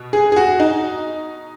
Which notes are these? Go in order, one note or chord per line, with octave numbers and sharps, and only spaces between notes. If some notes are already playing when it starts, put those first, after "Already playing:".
Already playing: B2
G#4
G#4
F#4
D#4